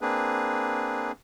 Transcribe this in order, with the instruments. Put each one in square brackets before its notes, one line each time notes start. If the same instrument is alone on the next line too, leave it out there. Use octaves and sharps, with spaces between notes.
[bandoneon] A#3 C4 D4 G#4 B4